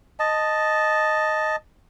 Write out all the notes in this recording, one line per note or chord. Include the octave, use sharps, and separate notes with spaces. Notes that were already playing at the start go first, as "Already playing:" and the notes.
D#5 A5